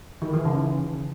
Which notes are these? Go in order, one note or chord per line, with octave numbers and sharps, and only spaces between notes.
D#3
E3
C#3